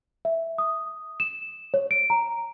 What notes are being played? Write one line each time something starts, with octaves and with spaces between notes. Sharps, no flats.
E5
D#6
E7
C#5
D7
A#5